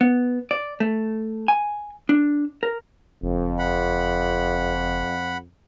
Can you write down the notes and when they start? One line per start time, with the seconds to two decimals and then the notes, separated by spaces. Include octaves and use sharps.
0.01 B3
0.51 D5
0.80 A3
1.48 G#5
2.09 D4
2.63 A#4
3.22 F#1 F2
3.59 F#5 B5